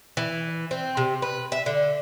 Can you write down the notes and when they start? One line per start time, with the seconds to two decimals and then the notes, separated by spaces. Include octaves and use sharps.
0.17 E3
0.71 C4
0.97 C3
1.22 B4
1.52 E5
1.66 D3